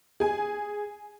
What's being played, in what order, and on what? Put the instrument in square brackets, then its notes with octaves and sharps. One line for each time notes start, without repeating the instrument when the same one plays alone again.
[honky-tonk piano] G#4 G#5